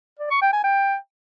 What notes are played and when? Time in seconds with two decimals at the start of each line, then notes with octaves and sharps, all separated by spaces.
0.20 D5
0.31 C#6
0.42 G5
0.53 G#5
0.64 G5